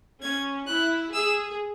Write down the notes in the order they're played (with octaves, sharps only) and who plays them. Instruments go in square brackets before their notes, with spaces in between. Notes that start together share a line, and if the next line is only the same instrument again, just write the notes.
[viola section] C#4 [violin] G#6
[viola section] E4 [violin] F#6
[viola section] G#4 [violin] E6